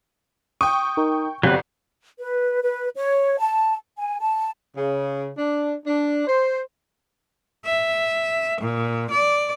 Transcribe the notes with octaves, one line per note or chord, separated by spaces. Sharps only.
G5 C#6 D#6
D#4 A#4
G1 F#3 C4 G4 B4
B4
B4
C#5
A5
G#5
A5
C#3
D4
D4
C5
E5
A#2
D5